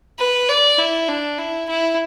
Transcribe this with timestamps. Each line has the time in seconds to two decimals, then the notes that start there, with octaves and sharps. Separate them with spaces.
0.19 B4
0.49 D5
0.78 E4
1.08 D4
1.38 E4
1.69 E4